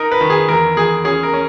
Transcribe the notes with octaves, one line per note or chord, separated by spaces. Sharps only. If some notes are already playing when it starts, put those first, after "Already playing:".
Already playing: D#4 A#4
B4
D#3
G#4
E2 A#4
E2 G#4
C#4 G#4
A#4
C#4